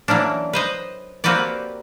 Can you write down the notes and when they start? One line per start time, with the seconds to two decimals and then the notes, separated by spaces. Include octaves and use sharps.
0.08 E3 F#3 A#3 C#4 D4
0.53 B4 C5 D#5
1.24 A#3 C4 F#4 G4 B4 D5